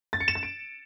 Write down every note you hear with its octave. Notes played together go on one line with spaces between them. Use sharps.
A6
C#7
E7
A6
D7